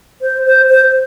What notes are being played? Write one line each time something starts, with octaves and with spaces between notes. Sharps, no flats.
C5
C5
C5